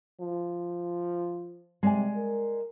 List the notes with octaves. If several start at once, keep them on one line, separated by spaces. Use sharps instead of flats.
F3
C3 G#3 D5 G#5
A#4